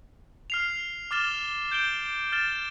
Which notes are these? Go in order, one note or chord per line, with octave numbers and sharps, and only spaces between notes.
F6 C7 F7
D6 F6 A6 E7 G7
G6 D7 G7
F6 A6 E7 G7